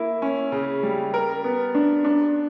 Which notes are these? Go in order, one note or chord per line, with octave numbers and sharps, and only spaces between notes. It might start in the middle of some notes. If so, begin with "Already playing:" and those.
Already playing: A#3 E4
C#4
C#3
G3
A#4
B3
D4
D4